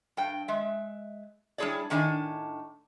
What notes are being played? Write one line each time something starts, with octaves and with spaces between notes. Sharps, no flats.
G2 G5
G#3 E5
G3 D4 E4 G#4 C#5 D5
A2 D#3 D4 D#5 G#5